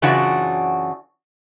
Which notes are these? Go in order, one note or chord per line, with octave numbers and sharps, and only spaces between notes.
F#2 C#3 E3 D4 F4 F#4